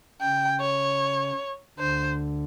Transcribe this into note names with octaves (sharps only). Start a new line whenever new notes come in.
C#3 G5
C#5
D2 D3 C5